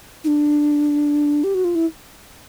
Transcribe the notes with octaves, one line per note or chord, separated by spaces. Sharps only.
D#4
D4
G4
F#4
F4
E4